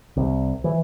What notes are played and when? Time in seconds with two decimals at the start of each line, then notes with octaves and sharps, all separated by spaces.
0.16 C2
0.64 E3